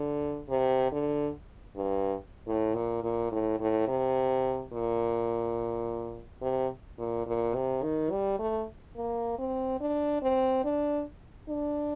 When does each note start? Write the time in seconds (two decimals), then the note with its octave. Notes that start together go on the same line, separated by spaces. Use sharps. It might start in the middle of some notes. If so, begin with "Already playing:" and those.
Already playing: D3
0.49 C3
0.92 D3
1.76 G2
2.47 A2
2.74 A#2
3.03 A#2
3.32 A2
3.60 A2
3.88 C3
4.73 A#2
6.42 C3
6.98 A#2
7.27 A#2
7.55 C3
7.83 D#3
8.11 G3
8.39 A3
8.96 A#3
9.38 C4
9.80 D4
10.22 C4
10.64 D4
11.49 D4